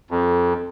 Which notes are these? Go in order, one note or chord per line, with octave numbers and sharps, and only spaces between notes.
F2